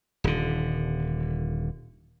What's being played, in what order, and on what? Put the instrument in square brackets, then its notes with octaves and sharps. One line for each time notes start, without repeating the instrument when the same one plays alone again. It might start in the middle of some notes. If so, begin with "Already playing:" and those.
[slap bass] D#1 D3